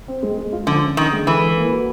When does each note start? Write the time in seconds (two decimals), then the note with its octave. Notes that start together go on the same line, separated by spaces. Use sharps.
0.08 C4
0.23 G#3
0.38 G#3
0.53 F4
0.67 D3 F3
0.83 C#4
0.97 D3 D#3
1.12 G#3
1.27 E3 A4
1.42 A4
1.57 A#3
1.72 F#4